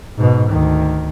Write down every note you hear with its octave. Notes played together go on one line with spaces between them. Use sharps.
G#2 B2
D2 D#3